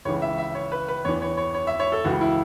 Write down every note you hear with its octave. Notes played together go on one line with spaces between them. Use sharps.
C#2 C#3 E3 C#5
E5
E5
C#5
B4
B4
E2 E3 C#5
C#5
C#5
C#5
E5
C#5
A4
C#2 C#3 E3 F#4
E4